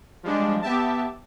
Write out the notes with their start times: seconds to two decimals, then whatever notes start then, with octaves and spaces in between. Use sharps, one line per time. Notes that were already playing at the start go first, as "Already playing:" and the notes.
0.23 F3 G3 G#3 D4
0.61 B3 G4 E5 A5